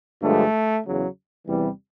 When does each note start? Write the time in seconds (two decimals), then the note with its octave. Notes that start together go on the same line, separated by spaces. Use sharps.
0.22 G2 D3 F3 G#3 A3
0.84 E2 C#3 F#3
1.47 E2 C3 E3 G3